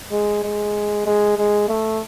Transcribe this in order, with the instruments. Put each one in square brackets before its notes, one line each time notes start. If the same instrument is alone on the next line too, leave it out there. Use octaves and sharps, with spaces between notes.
[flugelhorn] G#3
G#3
G#3
G#3
A3